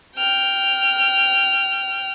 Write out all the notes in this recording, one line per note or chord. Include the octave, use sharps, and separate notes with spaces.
G5 F6